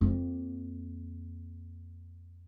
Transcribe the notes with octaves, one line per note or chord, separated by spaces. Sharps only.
F2 A#3